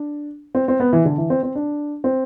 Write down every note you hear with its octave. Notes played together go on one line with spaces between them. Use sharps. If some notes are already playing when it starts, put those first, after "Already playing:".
Already playing: D4
C4
C4
B3
E3
D3
E3
C4
C4
D4
C4